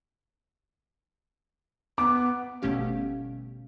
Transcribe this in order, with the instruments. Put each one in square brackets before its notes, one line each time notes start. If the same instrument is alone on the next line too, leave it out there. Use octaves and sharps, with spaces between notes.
[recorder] B3 [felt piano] D6
[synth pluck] G1 B2 A3 C#4 G4 F5